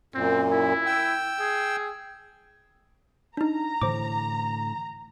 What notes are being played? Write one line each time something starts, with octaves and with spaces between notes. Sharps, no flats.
F#2 A#2 C4
E4
G5 E6
G#4
D4 D#4 A#5
A2 D3 E3 C5 D6